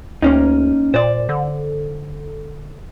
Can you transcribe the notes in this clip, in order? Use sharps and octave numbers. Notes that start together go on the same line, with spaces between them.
D2 A#3 C#4 D#4
A#2 C5 D5
D3